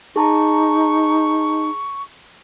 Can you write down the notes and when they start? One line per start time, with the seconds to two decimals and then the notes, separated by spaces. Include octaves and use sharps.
0.16 D#4 G#4 A5 A#5 C#6